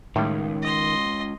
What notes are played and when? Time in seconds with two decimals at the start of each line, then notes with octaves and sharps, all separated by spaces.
0.16 C#2 A2 D#3 G3
0.63 D#5 C6